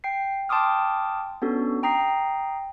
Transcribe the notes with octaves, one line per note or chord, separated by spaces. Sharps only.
G5 C7
G5 A5 C6 D6 D#6 F6
B3 C#4 D4 F#4 A4
G5 A#5 D#6 C7